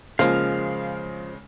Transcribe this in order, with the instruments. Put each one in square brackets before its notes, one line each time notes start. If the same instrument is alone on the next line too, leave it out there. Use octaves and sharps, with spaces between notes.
[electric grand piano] C#3 G#3 [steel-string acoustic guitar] F3 [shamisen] A#3 F4 [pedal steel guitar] F5